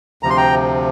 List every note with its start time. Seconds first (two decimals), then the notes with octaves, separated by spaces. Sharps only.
0.23 D2 C3 F3 A#5
0.30 C6
0.37 G5 A#5